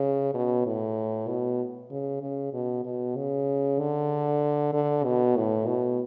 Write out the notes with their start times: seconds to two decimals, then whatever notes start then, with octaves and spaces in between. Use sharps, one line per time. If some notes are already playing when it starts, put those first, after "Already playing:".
Already playing: C#3
0.34 B2
0.66 A2
1.29 B2
1.91 C#3
2.22 C#3
2.53 B2
2.84 B2
3.16 C#3
3.79 D3
4.73 D3
5.04 B2
5.36 A2
5.67 B2